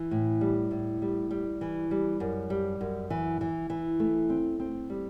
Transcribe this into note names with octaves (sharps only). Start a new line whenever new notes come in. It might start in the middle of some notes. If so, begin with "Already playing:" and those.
Already playing: E3
A2
G3
A2
G3
G3
E3
G3
F#2
G3
F#2
E3
E3
E3
A3
C4
C4
G3